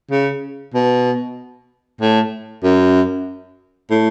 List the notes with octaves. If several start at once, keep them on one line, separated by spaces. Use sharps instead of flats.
C#3
B2
A2
F#2
A2